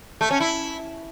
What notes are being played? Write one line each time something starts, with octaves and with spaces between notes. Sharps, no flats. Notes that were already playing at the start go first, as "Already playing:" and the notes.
A3
C#4
E4